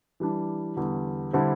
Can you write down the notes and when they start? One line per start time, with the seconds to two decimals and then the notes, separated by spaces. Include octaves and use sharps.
0.20 E3 G3 D4
0.77 E2 D3 G3
1.33 D3 G3 C4 E4 A4